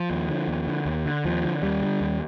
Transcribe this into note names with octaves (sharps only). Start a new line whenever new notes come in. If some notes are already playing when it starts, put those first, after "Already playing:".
Already playing: F3
D#2
D3
D#2
D3
D#2
D3
D#2 F3
D3
D#2 G3
D3
D#2